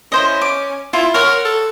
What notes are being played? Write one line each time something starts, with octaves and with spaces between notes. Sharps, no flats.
C#4 E4 C5 D#5
D6
E4 F4
A#4 C#5 F#5 C6
A4